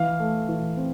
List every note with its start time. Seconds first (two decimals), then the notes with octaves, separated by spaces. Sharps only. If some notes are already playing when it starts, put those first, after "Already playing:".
Already playing: E3 F5
0.19 A3
0.48 E3
0.77 C4